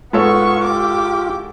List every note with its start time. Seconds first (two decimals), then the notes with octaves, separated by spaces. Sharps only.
0.13 G#2 B3 F4 A4 C#5 C#6
0.64 G4 D6